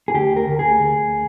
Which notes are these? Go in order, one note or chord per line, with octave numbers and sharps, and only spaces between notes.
G#4
D2 G4
A#4
D2
G#4
D2